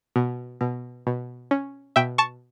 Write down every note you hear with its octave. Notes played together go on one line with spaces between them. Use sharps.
B2
B2
B2
C#4
B2 E5 G5
A5 C#6